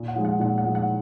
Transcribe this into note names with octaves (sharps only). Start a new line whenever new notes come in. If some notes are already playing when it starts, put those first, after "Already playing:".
Already playing: A#2
F#5
F3 G#3
F#5
A#2 F#5
F#5
F3 G#3
F#5